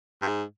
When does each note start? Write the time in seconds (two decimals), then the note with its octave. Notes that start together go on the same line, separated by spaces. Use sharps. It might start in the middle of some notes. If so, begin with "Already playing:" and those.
0.22 G2
0.28 G#2